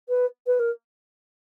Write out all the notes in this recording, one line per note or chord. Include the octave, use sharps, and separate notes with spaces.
B4
B4
A#4